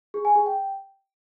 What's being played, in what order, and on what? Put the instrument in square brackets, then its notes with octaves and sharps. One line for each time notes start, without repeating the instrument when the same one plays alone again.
[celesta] G#4
G#5
G#4
G5